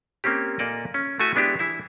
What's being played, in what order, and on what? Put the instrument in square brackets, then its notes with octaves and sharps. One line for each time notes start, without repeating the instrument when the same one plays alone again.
[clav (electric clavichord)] A#3 C4 C#4 G4
A#2 A#3 A4 D5 D#5
C#4
A3 E4 F#4 G#5
G#3 B3 D4 E4 G4
E3 E4 E5